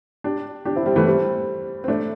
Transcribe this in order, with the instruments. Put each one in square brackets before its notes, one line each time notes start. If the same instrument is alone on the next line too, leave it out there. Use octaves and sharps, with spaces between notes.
[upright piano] D4 G4
D4 G4
C4 E4
G3 C4
E3 A3
G3 C4
C4
A3 D4